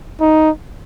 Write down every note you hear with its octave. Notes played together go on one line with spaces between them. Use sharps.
D#4